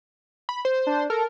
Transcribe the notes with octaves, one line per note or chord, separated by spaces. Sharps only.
B5
C5
D4
A4 A#4